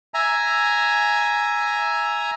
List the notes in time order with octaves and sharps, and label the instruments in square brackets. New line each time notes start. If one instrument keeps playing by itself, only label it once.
[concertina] E5 G#5 A#5